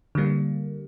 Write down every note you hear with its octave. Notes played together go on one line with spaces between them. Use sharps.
D3 G3 A#3